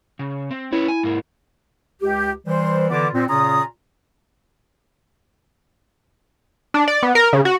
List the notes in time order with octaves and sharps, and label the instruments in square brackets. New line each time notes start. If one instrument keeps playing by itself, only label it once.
[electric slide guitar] C#3
C4
[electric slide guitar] C#4 B4 C#5 [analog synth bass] E4
[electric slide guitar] G#5
G#2 A#3
[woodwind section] C#2 G4
E3 G3 C5
D3 E3 B3 F4 D5 D6
A#2 C4
A#2 C#3 C#4 F4 A#5 D#6
[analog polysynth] D4
D5
B3
A#4
C#3
F#4